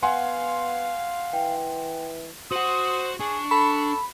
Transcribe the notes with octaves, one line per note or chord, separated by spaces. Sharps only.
B3 F5 F#5 G#5 C6
E3 G5
F#4 C5 F#5 C6 C#6 D#6
D4 G#4 C#6
A4 B5